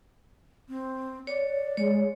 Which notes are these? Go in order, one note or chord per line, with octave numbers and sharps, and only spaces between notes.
C4
C#5 D5
G#3 C#5